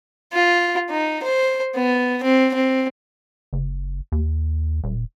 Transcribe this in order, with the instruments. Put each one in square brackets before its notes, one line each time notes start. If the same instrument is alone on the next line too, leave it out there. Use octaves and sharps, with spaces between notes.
[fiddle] F4
D#4
C5
B3
C4
C4
[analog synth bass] F#1
D#2
D#1